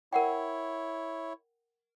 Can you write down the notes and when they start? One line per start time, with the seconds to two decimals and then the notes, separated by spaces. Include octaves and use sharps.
0.13 E4 A#4 C#5 F#5 G5